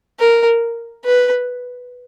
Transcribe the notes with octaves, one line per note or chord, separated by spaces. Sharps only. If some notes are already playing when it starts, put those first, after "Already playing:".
A#4
B4